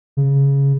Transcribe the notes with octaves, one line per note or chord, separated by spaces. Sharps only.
C#3